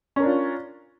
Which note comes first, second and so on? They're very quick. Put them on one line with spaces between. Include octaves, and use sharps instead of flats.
C#4 A#4 D4 F4